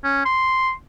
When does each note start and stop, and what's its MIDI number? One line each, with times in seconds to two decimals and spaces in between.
0.04 0.25 61
0.26 0.72 84